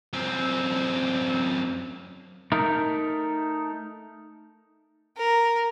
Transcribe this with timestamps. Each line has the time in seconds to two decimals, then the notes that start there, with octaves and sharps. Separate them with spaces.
0.13 F#2 C4
2.52 A3 D#4 A#4
5.18 A#4